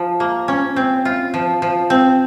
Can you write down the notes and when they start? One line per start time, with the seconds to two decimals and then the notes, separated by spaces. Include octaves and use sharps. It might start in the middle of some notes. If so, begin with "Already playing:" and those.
Already playing: F3
0.20 A#3
0.48 C#4
0.76 C4
1.05 F4
1.34 F3
1.62 F3
1.90 C4